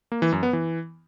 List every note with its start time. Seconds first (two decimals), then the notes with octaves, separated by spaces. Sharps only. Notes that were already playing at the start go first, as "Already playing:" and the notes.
0.12 A#3
0.22 E3
0.32 F#2
0.43 B3
0.53 E3